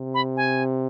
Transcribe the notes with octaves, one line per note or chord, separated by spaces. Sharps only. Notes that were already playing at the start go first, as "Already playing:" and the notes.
Already playing: C3
B5
G#5